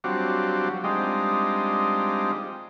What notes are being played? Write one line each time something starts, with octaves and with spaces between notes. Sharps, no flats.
F#3 G3 C4 D4 F4 F#4
G3 G#3 C4 D4 D#4 F4